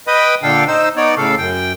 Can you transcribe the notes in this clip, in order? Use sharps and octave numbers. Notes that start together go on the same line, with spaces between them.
B4 D#5 G5 B5 D#6
A#2 D3 D4 A4 F5 G5
D#4 C5 E6
B3 D#4 C#5 D5
A2 C#3 A4 F5
F#2 G5